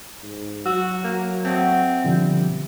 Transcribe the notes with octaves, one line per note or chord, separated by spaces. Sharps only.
G#2
F#3 F#4 E6
A#3
A3 C4 F#4 D#5
B2 D3 F3 G3